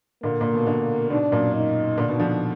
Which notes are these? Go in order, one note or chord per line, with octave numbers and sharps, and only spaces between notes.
A#2 D3 A#3
A#2
B2
A#2 D3
G#2 B2 D4
F#2 A#2
D#4
A#2 D3 D4
B2 D#3
D3 F3